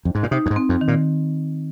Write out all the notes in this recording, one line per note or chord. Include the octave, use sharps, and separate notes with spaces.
F2
G#2
A#2
C3 D#4
F2
G#2
C4
F2
D#3
A#2